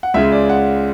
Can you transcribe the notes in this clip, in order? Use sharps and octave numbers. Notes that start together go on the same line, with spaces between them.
F#5
C#2 C#3 G#3 E5
D5
F#5